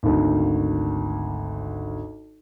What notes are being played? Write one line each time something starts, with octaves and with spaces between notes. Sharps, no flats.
G#1 D2